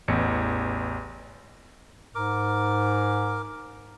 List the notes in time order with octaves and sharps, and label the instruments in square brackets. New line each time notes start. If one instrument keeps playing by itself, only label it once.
[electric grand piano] A1 E2 C#7
[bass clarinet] G#2 [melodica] A#4 D6